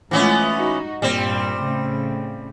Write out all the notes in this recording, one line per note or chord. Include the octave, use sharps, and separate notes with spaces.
A2 E3 G#3 B3 C#4 F4
D#4 F#4
G2 A#2 G3 C4
A2 C#3